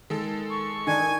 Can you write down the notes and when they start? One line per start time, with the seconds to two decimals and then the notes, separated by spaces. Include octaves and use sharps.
0.10 D#3 G#3 A4
0.50 C#6
0.87 D#3 D4 D#4 G#5